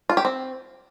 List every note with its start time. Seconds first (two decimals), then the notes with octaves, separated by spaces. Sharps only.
0.10 F4
0.17 G4
0.25 C4